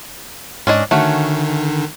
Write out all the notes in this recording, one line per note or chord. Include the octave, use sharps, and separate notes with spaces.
G#2 C#4 D4 D#5
D3 D#3 A3 C#4 F#4